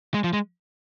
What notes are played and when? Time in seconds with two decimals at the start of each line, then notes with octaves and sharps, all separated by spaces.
0.14 G#3
0.24 F3
0.33 G#3